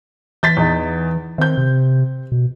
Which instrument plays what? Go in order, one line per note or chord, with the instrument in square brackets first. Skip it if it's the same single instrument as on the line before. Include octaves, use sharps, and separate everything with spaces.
[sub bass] E3 [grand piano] G6 A6 B6
[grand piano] E2 D#4
[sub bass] D#3 [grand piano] C4 G6
[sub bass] C3
B2